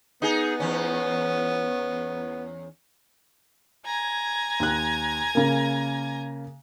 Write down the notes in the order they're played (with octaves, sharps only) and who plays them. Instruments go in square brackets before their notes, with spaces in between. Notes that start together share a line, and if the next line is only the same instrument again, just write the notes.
[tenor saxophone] B3 [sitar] D#4 G#4
[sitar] E2 C#4
[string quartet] G#5 A#5 G#6
[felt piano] D#2 F#6
C#3 A#3